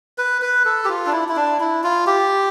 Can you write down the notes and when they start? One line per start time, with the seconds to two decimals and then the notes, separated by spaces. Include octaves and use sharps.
0.18 B4
0.42 B4
0.65 A4
0.84 G4
0.89 F4
1.06 D4
1.12 E4
1.29 E4
1.36 D4
1.60 E4
1.84 F4
2.07 G4